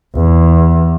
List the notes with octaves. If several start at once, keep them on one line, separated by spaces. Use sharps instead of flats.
E2